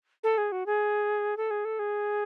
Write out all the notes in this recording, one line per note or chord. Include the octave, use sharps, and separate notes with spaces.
A4
G#4
F#4
G#4
A4
G#4
A4
G#4